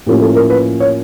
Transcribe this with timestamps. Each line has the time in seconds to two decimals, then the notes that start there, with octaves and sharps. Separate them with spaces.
0.06 A2 F3 A#3 C#4 G4
0.21 A4
0.36 A#4
0.50 B4
0.80 C#5